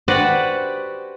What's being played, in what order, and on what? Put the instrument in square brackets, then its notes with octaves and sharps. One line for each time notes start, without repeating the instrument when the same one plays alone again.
[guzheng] F#4 G4 B4 C5 D5 F#5